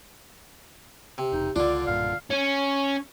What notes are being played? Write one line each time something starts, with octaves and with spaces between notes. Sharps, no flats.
C3
E1 D#4
C#2 D3 D4 F4 D5
B1 G2 A#2 F5
C#4